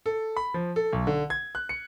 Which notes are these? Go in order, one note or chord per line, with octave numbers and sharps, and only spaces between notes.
A4
B5
F3
A4
B1
D3
G#6
F#6
C#7